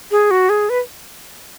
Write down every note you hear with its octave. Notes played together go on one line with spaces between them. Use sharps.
G#4
F#4
G#4
B4